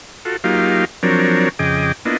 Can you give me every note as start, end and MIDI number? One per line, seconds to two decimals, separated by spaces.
0.25 0.37 65
0.25 0.37 66
0.25 0.37 69
0.44 0.85 54
0.44 0.85 58
0.44 0.85 63
0.44 0.85 65
0.44 0.85 67
0.44 0.85 77
1.03 1.49 53
1.03 1.49 54
1.03 1.49 60
1.03 1.49 62
1.03 1.49 70
1.03 1.49 73
1.59 1.92 41
1.59 1.92 49
1.59 1.92 68
1.59 1.92 75
1.59 1.92 79
1.59 1.92 86
2.05 2.17 58
2.05 2.17 59
2.05 2.17 62
2.05 2.17 64
2.05 2.17 65
2.05 2.17 75